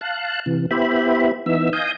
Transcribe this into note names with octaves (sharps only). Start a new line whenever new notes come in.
F5 A5 F#6
C3 E3
B3 E4 G4 C5 E5 B5
E3 B3 D#4 E5 E6
D#5 F5 G#5 D#6 G6